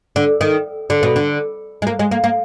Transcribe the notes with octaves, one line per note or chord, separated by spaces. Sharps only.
D3
D#3
D3
B2
D3
G#3
A#3
G#3
A#3
A#3